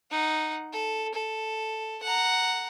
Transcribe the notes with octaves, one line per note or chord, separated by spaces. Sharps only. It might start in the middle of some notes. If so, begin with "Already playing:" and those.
D#4 F#5
A4
A4
F#5 A#5